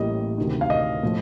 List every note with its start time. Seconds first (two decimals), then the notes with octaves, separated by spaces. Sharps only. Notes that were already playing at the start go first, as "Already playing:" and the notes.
Already playing: A1 A2 G3 A#3 D#5
0.38 D2 C3 D#3
0.61 F5
0.70 D#5
1.03 A2 F3